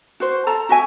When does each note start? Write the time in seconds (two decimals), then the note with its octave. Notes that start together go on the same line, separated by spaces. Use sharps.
0.20 F#4 C5
0.47 A4 A5 A#5
0.69 F#4 E5 G#5